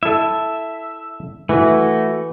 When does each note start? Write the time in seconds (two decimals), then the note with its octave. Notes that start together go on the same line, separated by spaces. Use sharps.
0.03 E4 A4 E5
1.49 E3 A3 E4 F#4